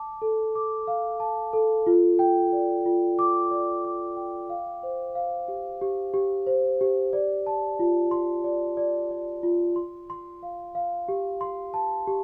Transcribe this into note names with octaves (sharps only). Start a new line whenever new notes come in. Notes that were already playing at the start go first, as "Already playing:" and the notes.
Already playing: A5 D6
A4
D6
F5
A5
A4
F4
G5
D5
F4
D6
D5
D6
G5
F5
C5
F5
G4
G4
G4
C5
G4
D5
A5
F4
C6
D5
D5
D5
F4
C6
C6
F5
F5
G4
C6
A5
G4